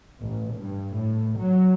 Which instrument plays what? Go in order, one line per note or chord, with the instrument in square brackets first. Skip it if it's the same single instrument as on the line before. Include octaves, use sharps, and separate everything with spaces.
[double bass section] A1
G2
A2
F#3